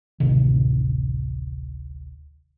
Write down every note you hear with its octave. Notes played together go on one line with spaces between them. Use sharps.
D1 A1 C3 D#3